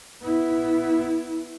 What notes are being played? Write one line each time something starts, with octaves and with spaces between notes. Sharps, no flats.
B3 E4